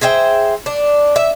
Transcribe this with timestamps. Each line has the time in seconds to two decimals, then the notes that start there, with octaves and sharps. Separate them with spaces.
0.01 G#4 C5 E5 G5
0.66 D4
1.16 E5